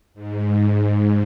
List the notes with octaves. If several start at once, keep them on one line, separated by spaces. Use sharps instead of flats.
G#2